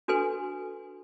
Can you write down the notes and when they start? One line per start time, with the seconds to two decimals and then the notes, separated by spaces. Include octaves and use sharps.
0.08 D4 F#4 A4 B4 G#5 C6